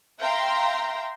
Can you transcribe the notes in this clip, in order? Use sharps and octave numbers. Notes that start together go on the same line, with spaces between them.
E5 F5 G5 A#5 C6